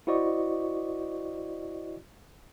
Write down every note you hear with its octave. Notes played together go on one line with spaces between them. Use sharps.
E4 F#4 C5 D5 D#5 C#6